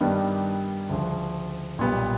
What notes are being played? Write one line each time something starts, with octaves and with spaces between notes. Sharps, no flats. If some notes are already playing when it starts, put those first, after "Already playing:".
G2 D#3 G3 B3 D4
D2 C#3 F3
B1 A#2 G3 B3